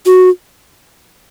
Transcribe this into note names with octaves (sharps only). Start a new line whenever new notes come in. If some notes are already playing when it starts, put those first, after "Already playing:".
F#4